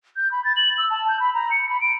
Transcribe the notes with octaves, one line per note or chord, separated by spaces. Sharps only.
G6
B5
A6
F#7
E6
A5
G6
B5
A#5
C#7
B5
D7